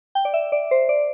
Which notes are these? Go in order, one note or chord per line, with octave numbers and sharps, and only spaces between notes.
G5
D5
E5
D5
C5
D5